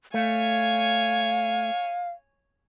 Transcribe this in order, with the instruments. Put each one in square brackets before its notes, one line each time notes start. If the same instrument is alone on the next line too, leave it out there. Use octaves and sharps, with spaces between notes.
[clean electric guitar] A3 [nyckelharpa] C#5 G#5 [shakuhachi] F5